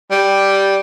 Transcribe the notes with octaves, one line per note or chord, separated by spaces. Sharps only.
G3